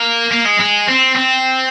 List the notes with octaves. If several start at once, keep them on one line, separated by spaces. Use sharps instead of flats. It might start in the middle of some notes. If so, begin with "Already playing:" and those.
Already playing: A#3
A#3
G#3
G#3
C4
C4